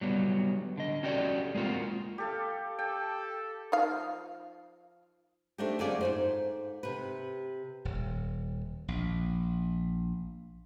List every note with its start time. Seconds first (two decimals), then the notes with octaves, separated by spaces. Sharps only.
0.01 F#3 G3 B3
0.78 D3 D#5
1.03 C#4 F#4 G4 A4 D5
1.55 G#3 A#3 C4 F4 F#4
2.18 G4 A4 F5
2.79 A4 G5
3.72 F3 D#4 F5
5.58 A3 C4 D4 D#4 G4
5.79 F#2 D3 A3 F4 G#4 D5
6.01 G#2 B2 C5
6.83 C3 B4
7.85 D#1
8.88 A#1